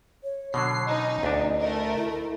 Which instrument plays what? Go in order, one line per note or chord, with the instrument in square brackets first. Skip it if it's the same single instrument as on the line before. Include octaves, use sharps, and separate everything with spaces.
[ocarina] C#5
[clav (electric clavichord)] B2 D3 F#3 [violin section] C7
[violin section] C#4 D#4 [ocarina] D#5
[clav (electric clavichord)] D2 D4
[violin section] A3 A#4
[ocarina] E4